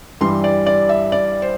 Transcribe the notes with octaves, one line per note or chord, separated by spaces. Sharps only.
G2 E3 G3 C6
D5
D5
E5
D5
C5